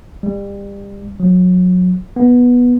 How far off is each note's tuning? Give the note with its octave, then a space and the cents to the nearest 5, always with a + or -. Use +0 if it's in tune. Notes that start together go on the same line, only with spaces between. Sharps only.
G3 +30
F#3 -30
B3 -10